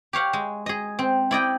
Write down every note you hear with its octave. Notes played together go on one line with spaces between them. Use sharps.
G4 C#5 F5 F#5
G#3
G#4 D#5
C4
E4 D5 D#5 G5